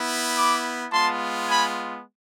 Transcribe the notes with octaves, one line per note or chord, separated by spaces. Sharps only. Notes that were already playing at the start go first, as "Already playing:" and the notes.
Already playing: B3 E4
B5 D6
G#3 B3 F4 A5 C6
G#5 B5